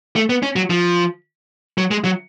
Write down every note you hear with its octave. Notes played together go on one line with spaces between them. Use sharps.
A3
B3
C#4
F#3
F3
F#3
G#3
F#3